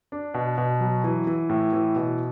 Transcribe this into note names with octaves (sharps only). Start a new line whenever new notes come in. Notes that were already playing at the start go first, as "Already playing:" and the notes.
D4
B2
B2
F#3
E3
E3
A2
E3
B2